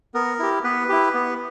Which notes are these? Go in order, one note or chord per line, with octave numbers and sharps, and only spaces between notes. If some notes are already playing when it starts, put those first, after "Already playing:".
B3 A#4
E4 G4
B3 B4
E4 G4
B3